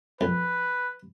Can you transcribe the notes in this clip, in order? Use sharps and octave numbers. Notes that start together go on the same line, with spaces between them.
F2 B4